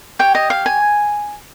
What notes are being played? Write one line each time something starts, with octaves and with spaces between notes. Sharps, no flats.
G4 C#5 G5
D#5
F5
G#5